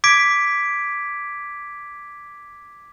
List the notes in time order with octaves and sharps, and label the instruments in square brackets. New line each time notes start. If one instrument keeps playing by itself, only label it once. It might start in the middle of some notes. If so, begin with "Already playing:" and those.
[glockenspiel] D6 G#6 B6 D7